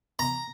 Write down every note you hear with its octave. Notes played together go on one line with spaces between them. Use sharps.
A#5